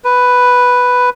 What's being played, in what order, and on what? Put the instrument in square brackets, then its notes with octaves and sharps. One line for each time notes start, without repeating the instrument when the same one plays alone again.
[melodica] B4